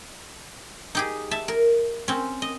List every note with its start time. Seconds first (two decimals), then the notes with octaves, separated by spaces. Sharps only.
0.95 D#4 G4 G#4
1.31 E5 A5
1.48 A#4
2.08 C4 C#4
2.42 D#5